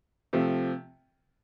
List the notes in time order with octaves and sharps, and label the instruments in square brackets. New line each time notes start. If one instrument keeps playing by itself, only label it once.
[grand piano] C3 F3 A3